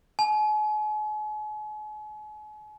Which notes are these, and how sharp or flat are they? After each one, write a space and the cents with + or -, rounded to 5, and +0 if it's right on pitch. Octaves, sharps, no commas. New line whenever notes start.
G#5 +40